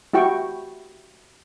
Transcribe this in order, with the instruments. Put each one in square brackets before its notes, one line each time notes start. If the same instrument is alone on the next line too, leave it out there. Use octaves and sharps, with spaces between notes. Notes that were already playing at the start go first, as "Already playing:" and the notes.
[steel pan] E4 F#4 G4 G5 C#6